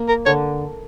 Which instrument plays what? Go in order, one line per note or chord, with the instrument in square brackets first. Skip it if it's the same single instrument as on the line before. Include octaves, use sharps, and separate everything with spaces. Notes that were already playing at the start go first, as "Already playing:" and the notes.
Already playing: [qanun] A#3
[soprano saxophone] A#4
[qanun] D3 [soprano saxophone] C#5